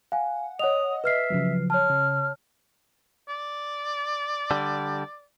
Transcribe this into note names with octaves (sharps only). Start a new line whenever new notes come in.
F5 F#5 G#5
C#5 D#5 F#5 D#6 F7
B4 E5 F6 C7
C#3 F3 F#3
C#5 A5 F6
C#3
D5
D3 G3